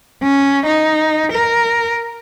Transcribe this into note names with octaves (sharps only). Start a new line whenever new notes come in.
C#4
D#4
A#4